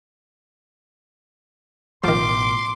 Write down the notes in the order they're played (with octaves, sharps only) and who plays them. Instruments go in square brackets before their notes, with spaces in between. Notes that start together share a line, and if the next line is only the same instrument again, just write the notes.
[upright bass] A1 B2 [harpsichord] D#3 F3 [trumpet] C6 [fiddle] D6